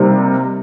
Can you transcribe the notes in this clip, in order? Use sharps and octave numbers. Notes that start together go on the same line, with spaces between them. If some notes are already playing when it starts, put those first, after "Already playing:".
Already playing: C3 G3 A#3 D#4